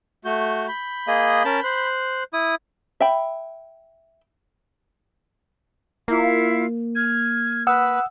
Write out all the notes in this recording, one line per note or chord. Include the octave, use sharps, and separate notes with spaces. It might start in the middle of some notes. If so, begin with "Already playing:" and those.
A3 F#4 G6
B5 G6
A#3 G#4 D#5
C#4 A#4 A5
C5 F#6
E4 D#6
E5 G5 B5
A#3 E4 F4 F5
F6 G#6
B4 F#5 D#6 E6